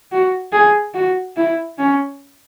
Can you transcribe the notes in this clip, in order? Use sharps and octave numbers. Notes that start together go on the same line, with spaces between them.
F#4
G#4
F#4
E4
C#4